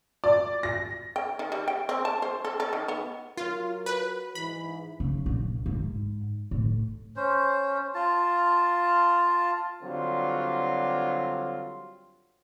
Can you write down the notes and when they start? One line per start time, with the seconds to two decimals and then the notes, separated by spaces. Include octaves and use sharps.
0.24 D5
0.63 A#6
1.16 G5
1.39 D#3
1.52 G3
1.68 G5
1.89 C4
2.05 A5
2.22 C5
2.45 A4
2.60 A4
2.73 D#3
2.88 B3
3.37 F#3 F4 A#4
3.86 B4
4.35 G#2 E3 B5
5.00 C#3
5.26 A#1
5.66 G#2
6.51 A2
7.16 C#4 C5
7.95 F4 A5
9.83 D3 F#3 G3 C4 F4